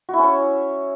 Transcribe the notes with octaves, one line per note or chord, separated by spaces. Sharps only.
C#4 E4 F#4 C#5